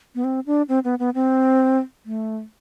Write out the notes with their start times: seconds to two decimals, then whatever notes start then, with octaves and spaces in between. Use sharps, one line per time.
0.15 B3
0.24 C4
0.46 D4
0.69 C4
0.84 B3
0.99 B3
1.15 C4
2.06 A3